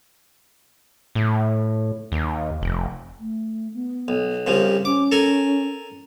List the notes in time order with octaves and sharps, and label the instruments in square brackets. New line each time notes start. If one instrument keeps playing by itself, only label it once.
[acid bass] A2
D#2
F1
[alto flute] A3
B3
[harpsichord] B1
[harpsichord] C2 C#3 F3 [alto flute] G4
[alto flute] C#4 [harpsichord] D6
[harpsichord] A4 A#4 G#5